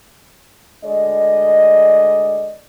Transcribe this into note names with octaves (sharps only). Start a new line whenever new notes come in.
D2 G#3 D5 D#5